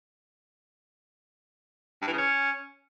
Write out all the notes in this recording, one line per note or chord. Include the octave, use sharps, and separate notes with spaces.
G2
E3
C#3
C#4